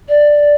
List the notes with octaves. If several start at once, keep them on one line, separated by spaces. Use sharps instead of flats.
D5